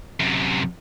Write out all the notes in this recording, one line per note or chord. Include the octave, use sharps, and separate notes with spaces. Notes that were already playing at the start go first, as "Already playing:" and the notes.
F#2 C3